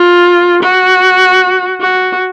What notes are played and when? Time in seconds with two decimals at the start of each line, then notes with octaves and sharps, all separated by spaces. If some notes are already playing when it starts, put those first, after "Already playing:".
Already playing: F4
0.63 F#4
1.81 F#4